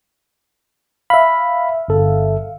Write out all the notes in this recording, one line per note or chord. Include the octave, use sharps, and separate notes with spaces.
E5 F5 B5
G1 A4